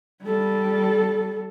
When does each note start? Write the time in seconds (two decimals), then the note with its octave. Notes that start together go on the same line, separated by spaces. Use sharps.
0.22 G3 A4